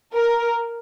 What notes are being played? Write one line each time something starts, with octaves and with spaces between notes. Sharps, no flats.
A#4